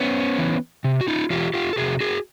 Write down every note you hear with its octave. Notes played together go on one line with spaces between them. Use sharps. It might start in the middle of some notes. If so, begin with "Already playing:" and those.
Already playing: B3 C#4
E3
C3
F#4
D#4 F4
E3 F4 G4
F4 G4
A4
C3 F#4 G#4
F#4 G#4